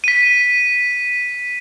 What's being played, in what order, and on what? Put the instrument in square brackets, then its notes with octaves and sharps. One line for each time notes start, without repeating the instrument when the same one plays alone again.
[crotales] B6 D#7